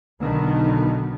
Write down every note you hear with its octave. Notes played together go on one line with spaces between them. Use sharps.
B1 D3 D#3 B3